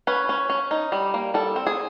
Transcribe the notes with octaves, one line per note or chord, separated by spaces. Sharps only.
C#4 B4
C#4
C#4
D#4
G3
A#3
G3 A4
C4
G#4